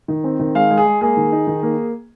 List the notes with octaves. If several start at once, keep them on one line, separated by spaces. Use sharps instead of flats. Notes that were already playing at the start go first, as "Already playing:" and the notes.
D#3
C4
D#3
G#3 F5
G#3
G#4
G#3
A#3 G#4
D#3
D#4
D#3
A#3